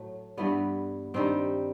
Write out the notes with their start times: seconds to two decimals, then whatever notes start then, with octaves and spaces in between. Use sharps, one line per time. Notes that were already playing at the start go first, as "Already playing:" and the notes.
Already playing: A2 F#3 A3
0.37 G2 E3 G3 B3
1.14 G2 D#3 G3 C4